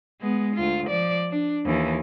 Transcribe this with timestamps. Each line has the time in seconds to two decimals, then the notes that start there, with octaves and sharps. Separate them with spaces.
0.21 G#3 B3
0.55 D2 F4
0.87 F3 D5
1.30 D4
1.66 D#2 E3